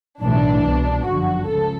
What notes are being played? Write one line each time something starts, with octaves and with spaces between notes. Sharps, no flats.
B1 A2 E3 D4
C2 B2
G1 F#2 D3 F3 F#4
C#2 C#3 F3 A4